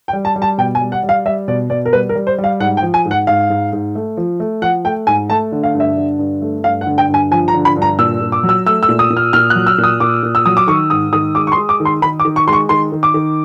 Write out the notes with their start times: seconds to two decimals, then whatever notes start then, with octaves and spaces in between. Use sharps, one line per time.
0.08 G5
0.13 G3
0.25 A5
0.36 G3
0.42 A5
0.58 B2 G5
0.75 G#5
0.81 G3
0.92 F#5
1.03 G3
1.09 F5
1.25 G3 E5
1.48 B2 D5
1.70 B2 D5
1.85 A#4
1.93 G3 B4
2.09 A#4
2.15 G3
2.27 C5
2.38 G3
2.44 F5
2.60 G#2 F#5
2.77 G5
2.82 F3
2.94 G#5
3.05 G#2
3.11 F#5
3.27 G#2 F5
3.50 G#2
3.73 G#2
3.95 A3
4.17 F3
4.40 A3
4.62 F3 F#5
4.85 A3 G5
5.07 G#2 G#5
5.30 A3 A5
5.52 D3
5.63 F5
5.74 G2
5.80 E5
5.97 D3
6.19 G2
6.42 A3
6.64 G2 F5
6.81 F#5
6.86 D3
6.98 G5
7.09 G2 G#5
7.31 F3 G#5
7.48 A#5
7.54 D3
7.65 B5
7.76 G2
7.82 A#5
7.99 A#2 E6
8.21 A#2
8.32 D6
8.43 F#3
8.49 E6
8.66 A3 E6
8.83 E6
8.89 A#2
8.99 D#6
9.10 A#2
9.17 F6
9.33 A#2 F6
9.50 F#6
9.55 F#3
9.67 E6
9.78 A#2
9.84 D#6
10.00 A#2 D6
10.23 A#2
10.35 E6
10.46 F#3 D#6
10.57 D6
10.67 D#3 C#6
10.90 G#2 D#6
11.13 D#3 D#6
11.35 G#3 D6
11.47 C#6
11.52 C6
11.57 G#3
11.69 D6
11.80 D#3
11.85 C6
12.02 D#3 B5
12.20 D6
12.25 D#3
12.36 C#6
12.48 G#3 C6
12.53 C#6
12.69 D#3 C6
12.92 D#3
13.03 D6
13.14 D#3